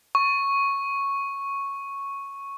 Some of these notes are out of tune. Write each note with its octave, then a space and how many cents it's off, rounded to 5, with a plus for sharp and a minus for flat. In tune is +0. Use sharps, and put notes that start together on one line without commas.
C#6 -5